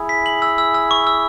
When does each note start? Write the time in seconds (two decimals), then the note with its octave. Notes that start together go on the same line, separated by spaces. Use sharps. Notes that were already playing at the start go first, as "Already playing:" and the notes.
Already playing: E4 G#4
0.09 B6
0.26 F#7
0.42 E6
0.58 E6
0.74 E6
0.91 C#6
1.07 E6